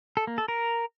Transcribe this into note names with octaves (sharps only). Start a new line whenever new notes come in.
A4
A#3
A4
A#4